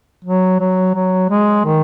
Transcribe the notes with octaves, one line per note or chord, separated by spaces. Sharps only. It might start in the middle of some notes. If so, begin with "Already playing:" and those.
F#3
F#3
F#3
G#3
D#3